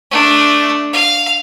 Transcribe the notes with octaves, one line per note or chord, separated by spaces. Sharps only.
A3 D4
F5